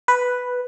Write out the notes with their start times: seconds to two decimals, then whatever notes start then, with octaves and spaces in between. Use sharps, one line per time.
0.08 B4